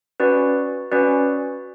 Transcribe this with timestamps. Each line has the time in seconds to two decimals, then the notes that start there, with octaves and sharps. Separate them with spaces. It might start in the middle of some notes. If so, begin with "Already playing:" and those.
0.20 C#4 F#4 B4 D5
0.91 C#4 F#4 B4 D5